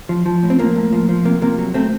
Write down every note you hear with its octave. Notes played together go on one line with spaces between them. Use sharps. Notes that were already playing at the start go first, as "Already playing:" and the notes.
F3
F3
A2
C4
F3 A#3
A2
F3
F3
C3 A#3
C3 A#3
F#3
F#3 A3 C4